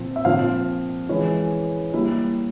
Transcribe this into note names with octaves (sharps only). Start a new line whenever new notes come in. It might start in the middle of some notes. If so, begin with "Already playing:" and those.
Already playing: A#2 F3 C4
E5
A#2 F3 C4 F4 F5
E3 G#3 C#4 E4 C#5
G3 A#3 E4